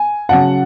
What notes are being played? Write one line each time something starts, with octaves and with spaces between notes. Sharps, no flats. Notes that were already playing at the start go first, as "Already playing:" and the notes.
Already playing: G#5
C#3 F#3 C#4 F#5 A5